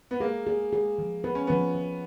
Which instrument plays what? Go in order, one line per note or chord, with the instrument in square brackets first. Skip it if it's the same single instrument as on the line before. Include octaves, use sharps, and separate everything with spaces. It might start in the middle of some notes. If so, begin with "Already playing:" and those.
[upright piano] B3
[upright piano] A#3 [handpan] G#4
[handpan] G#4
G#4
F3
[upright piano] B3 [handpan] B4
[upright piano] C#4
[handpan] F3 [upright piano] B3
[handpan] F3